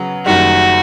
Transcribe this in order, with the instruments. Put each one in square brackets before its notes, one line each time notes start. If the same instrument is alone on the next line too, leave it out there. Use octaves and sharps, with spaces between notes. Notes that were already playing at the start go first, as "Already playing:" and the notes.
Already playing: [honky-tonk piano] C#3 F#3 B3
[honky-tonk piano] F#1 F#2 D#3 G3 [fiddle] F#4